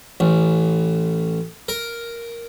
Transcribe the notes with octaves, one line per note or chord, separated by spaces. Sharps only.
A1
A#4